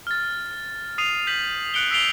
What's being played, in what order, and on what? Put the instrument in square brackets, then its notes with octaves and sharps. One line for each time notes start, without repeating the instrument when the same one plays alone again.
[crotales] F6 A6
D#6 C7 D#7 F7
G6 B6 F#7
F#6 C#7 D7 F7 G7
E6 B6 C7 D7 F7 G7